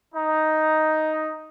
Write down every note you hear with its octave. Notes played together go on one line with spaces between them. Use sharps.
D#4